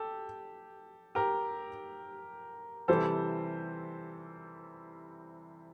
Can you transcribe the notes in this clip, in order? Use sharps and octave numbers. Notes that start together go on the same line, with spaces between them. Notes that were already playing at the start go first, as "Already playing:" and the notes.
Already playing: G4 A4
G4 A#4
C3 E3 G3 A4 C5